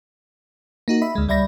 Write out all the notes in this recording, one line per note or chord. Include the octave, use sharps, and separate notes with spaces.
A#3 D#4 F#4
D#5 E5 B5
D2 G#3
C#2 G3 D5 E5 B5 A#6